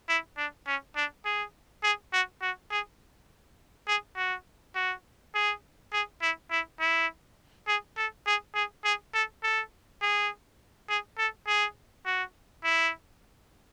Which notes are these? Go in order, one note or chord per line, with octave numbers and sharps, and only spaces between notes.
E4
D4
C#4
D4
G#4
G#4
F#4
F#4
G#4
G#4
F#4
F#4
G#4
G#4
E4
E4
E4
G#4
A4
G#4
G#4
G#4
A4
A4
G#4
G#4
A4
G#4
F#4
E4